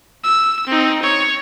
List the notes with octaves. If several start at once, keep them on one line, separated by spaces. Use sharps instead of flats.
E6
C4 D#4
C#5